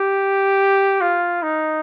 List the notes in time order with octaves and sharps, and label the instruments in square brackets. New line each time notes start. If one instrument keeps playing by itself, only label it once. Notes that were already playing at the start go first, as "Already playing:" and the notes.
Already playing: [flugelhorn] G4
F4
D#4